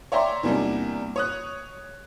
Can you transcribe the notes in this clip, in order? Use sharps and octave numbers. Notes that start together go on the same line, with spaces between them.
C#5 D5 E5 G5 A#5 C6
E2 C3 G3 A#3 D4 D#4
C#5 D#6 F#6